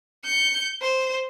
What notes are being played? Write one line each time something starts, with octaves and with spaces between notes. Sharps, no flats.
G6 C#7
C5